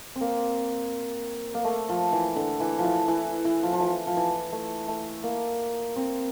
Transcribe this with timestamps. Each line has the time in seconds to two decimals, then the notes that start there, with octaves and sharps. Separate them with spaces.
0.16 C4
0.21 A#3
1.54 A#3
1.64 A3
1.89 F3
2.13 E3
2.36 D3
2.60 E3
2.78 F3
2.84 E3
3.08 E3
3.45 E3
3.63 F3
3.73 F3
3.80 E3
4.07 F3
4.17 E3
4.52 A3
4.88 A3
5.24 A#3
5.96 C4